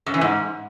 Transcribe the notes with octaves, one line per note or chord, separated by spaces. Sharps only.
F#2
E3
G#2